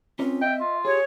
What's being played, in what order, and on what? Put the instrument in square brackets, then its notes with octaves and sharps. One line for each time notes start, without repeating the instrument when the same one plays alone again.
[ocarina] C4 [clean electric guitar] C#4 F4 C#5
[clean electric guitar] D#5 E5 [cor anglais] G5
[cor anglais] F4
[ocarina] G4 [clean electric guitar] G#4 [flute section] C#5